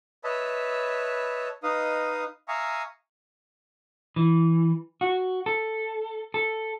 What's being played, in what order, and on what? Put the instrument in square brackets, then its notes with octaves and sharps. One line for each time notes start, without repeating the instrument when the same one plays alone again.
[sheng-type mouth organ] B4 C#5 D#5 E5 A5 B5
D#4 B4 D#5 F5 D#6
E5 F5 G#5 A#5 C#6 D#6
[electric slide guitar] E3
F#4
A4
A4